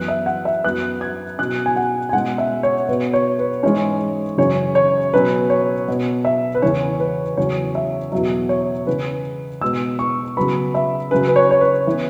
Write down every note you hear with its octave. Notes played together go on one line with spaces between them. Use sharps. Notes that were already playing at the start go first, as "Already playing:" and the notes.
Already playing: F#2 E3 B3 F#6
E5
F#5
E5
F#2 F#3 B3 F#6
G#6
B2 F#3 C#4 F#6
G#5
F#5
G#5
B2 G#3 C#4 F#5
E5
C#5
B2 B3 B4
C#5
B4
G#2 E3 G#3 C#4 C#5
F#2 C#3 E3 C#4 C#5
C#5
B2 F#3 C#4 B4
C#5
B2 B3
E5
B4
E2 C#3 E3 C#4 C#5
B4
E2 C#3 F#3 C#4 C#5
E5
E2 B2 F#3 E5
C#5
C#3 E3 C#4 B4
B2 G#3 B3 E6
C#6
C#3 F#3 B3 B5
E5
C#3 F#3 C#4 B4
B4
C#5
C#5
B4
E3 B3